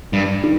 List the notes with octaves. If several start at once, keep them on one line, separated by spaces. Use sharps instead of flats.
G2
D#3